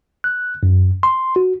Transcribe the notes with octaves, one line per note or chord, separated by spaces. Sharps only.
F#6
F#2
C6
F#4